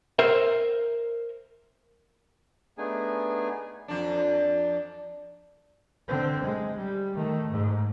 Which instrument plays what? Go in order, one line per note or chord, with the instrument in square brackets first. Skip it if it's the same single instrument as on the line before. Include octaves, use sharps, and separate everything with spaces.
[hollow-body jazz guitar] A#4 C5 E5
[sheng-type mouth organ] A3 B3 D4 D#4 G#4 G#5
[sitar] F2 D4
[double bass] D3 C4
G#3
G3
D#3 A3
G#2